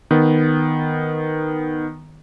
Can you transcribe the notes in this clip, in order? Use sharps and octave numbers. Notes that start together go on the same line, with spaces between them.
D#3 B3